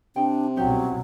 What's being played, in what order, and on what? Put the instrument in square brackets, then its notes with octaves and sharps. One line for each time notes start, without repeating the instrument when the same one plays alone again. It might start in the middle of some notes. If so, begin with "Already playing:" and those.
[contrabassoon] C3 [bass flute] D4 [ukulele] D#4 G5
[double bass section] C2 B2 [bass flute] F#3 [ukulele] C#4 D#4 G4